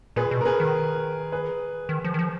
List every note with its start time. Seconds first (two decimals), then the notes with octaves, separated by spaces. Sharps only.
0.16 A#2 G#4 B4
0.31 B2
0.41 A#4
0.45 G#4 B4
0.60 D#3
1.32 G#4 B4
1.89 D#3
2.04 F3
2.14 D#3
2.19 F3